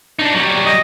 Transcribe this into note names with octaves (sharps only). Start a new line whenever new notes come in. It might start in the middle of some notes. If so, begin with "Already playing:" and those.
D4 D#4
F#3 G3
D#5